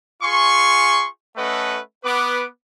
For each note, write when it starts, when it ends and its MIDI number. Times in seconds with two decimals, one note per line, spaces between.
0.22 1.07 65
0.22 1.07 68
0.22 1.07 80
0.22 1.07 84
0.22 1.07 85
1.37 1.80 57
1.37 1.80 61
1.37 1.80 69
1.37 1.80 71
1.37 1.80 75
1.37 1.80 78
2.04 2.46 59
2.04 2.46 71
2.04 2.46 86